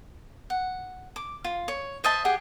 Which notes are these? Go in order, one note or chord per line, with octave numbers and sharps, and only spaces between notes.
F#5
D6
F4
C#5
C5 D#5 E5 A5
G4 G#4 F#5